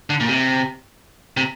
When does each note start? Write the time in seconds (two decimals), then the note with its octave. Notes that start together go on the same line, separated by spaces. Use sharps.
0.10 D3
0.20 A#2
0.29 C3
1.37 C3